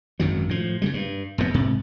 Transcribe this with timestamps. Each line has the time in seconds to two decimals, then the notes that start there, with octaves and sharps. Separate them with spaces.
0.20 G#1 F#2 D#3 F#3
0.49 A2 F3
0.82 C#3 F#3 G3
0.94 G2
1.38 F1 F#2 C3 B3
1.54 G#2 C3